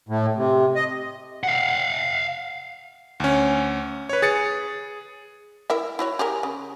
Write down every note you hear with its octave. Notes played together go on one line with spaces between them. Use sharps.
A2
C3
D#5
F5 F#5
D2 C#4
B4 C#5
G#4 A6 C#7
E4 A#4 E5
E4 F#4 C#5
G4 G#4 A#4
C#3